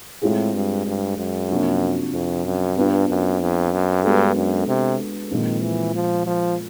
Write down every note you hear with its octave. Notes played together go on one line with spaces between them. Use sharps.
A2 G#3 C4 F4 G#4
G2
G2
F#2
C3 F3 A#3 D4 F#4
F2
F#2
G2 B3 D4 F4
F#2
F2
F#2
G2 G#3 B3 D4 F#4 A4
F#2
C3
A#2 D#3 F3 G#3 C4
E3
F3
F3